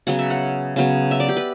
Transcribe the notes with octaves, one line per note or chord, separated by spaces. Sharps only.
C#3 F#3 B3 F#5
E5
F#5
C#3 F#3 B3
E5
D5
G4
B4